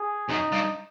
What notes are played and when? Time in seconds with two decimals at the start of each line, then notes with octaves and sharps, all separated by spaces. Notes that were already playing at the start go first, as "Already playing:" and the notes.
Already playing: G#4
0.29 F#2 D#4
0.52 G2